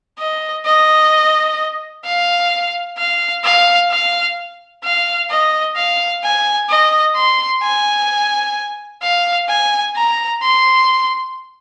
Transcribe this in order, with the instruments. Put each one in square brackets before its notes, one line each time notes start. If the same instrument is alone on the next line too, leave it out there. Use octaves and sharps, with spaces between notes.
[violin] D#5
D#5
F5
F5
F5
F5
F5
D#5
F5
G#5
D#5
C6
G#5
F5
G#5
A#5
C6